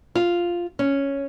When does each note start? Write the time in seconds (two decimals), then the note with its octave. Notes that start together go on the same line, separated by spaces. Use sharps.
0.15 F4
0.79 C#4